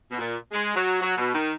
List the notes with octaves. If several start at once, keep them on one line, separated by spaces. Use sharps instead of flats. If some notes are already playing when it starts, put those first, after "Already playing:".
B2
A#2
G#3
F#3
F#3
B2
D#3